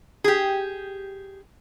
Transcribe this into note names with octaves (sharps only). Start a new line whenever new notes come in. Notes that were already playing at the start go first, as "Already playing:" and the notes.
G4 G#4